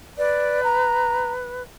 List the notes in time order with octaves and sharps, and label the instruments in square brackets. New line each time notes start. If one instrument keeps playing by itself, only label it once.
[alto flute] B4 [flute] D5
[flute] A#5